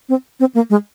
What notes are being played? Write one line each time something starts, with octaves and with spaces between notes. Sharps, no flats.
C4
C4
A#3
G#3